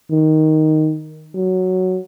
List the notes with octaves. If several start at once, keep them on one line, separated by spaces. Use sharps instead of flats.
D#3
F#3